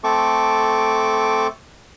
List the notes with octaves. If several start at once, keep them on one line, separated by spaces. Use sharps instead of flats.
A3 C4 A4 C#6 D6